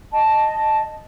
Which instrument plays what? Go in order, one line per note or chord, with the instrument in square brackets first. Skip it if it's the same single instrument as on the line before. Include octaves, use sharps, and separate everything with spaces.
[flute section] D#5 A5